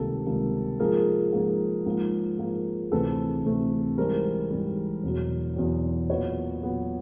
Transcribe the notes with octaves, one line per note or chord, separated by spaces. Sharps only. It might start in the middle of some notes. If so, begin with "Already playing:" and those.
Already playing: C#2 C3 D#3 G3 A#3 G4 A4
C#2 C3 D#3 G3 A#3
G#2 F3 A#3 G#4 A#4
G#2 F3 A#3
G#2 F3 A#3
G#2 F3 A#3
D2 C3 E3 A3 C4 A4 B4
D2 C3 E3 A3 C4
G#2 E3 G3 A#4 C5
G#2 E3 G3
E2 B2 F#3
E2 B2 F#3
A#2 F#3 B3 B4 C#5
A#2 F#3 B3